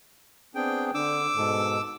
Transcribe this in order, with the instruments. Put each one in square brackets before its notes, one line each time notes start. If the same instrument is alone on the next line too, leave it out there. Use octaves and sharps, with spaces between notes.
[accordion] B3 D4 G#4 [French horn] C4 [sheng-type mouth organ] G5
[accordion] D3 [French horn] D4 [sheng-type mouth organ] D6 E6
[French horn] G#2 [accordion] B2 A4